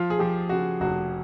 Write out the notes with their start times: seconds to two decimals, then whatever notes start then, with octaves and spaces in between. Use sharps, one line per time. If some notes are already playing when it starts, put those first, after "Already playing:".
Already playing: F3 F4
0.10 G#4
0.19 F3 G4
0.49 C#3 F#4
0.80 F1 F#4